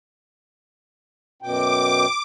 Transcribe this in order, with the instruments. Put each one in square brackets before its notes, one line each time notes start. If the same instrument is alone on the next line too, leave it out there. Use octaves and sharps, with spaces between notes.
[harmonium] F#2 B2 G5 [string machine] D6